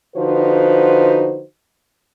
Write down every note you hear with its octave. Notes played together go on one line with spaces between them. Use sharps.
D3 F3 D#4 F#4 B4 C5